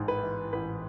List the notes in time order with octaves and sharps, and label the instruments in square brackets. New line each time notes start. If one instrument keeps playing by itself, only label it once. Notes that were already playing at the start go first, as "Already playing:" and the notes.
Already playing: [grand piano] A1 G#2
B4
E3
A1 B4